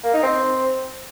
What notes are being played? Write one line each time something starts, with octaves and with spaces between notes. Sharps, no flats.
A#3
D#4
C4